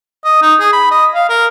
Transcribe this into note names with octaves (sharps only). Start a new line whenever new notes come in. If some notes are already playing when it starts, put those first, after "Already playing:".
D#5
D#4
G#4
B5
D#5
F5
A#4